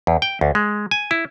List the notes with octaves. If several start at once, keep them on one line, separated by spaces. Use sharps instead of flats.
E2
G5
D2
G#3
G#5
E4